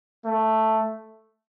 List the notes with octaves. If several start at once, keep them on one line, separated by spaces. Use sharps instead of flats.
A3